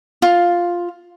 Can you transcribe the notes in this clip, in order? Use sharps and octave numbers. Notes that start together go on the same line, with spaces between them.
F4